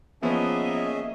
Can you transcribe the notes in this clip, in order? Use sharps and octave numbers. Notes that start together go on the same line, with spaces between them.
F3 A#3 B3 C#4 G#4 D#5 E5